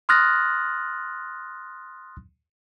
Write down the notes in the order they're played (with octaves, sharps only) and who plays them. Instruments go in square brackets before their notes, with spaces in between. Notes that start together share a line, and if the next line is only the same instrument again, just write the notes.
[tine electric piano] C6 D#6 F6 F#6 A6 A#6